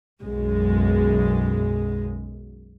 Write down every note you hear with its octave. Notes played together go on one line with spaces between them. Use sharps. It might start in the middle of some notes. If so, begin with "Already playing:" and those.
B1 F#2 G#3